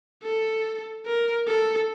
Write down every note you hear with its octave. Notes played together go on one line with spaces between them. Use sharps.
A4
A#4
A4